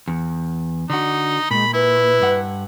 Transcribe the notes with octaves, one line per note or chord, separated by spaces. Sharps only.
E2
D3 D#4 F#4
A#2 G#3 B5
E4 B4
G2 F#5